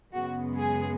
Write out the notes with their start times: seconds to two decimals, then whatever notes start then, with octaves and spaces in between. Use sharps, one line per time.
0.14 F#2 C#3 G#3 B3 F#4
0.57 G#4